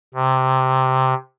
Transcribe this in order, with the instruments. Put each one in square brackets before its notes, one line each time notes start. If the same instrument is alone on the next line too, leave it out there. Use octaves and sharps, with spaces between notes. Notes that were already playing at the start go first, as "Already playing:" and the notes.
[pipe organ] C3